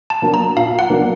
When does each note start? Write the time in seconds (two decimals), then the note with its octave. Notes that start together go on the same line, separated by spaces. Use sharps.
0.10 A5
0.22 F#3 A#3 D4
0.34 A#5
0.56 A#2 F5
0.79 F#5
0.90 F#3 A#3 D4